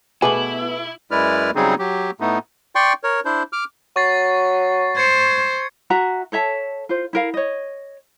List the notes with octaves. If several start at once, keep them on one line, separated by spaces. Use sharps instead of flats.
B2 A3 B3 E4 G#4 D6
F#2 G#3 E4 B4 D5 F6
C#3 F#3 G3 C4 D#4 G#4
F#3 G4
A2 A3 B3 D#4
D5 G5 C6 C#6
A#4 C#5
D4 E4 C5
D6 F6
F#3 C#6 A6 C7
C5 G#6 C#7
F#4 E5 A#5
A4 C#5 E5 A5
F4 C5
E4 A#4 F5
C#5 D#5